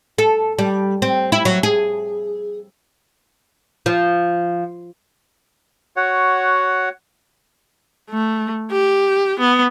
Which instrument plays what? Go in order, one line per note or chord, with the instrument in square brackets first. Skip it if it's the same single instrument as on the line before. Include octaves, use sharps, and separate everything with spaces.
[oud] A4
G3
C4
E4
F#3
G#4
F3
[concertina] F#4 C#5 F#5
[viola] A3
G4
B3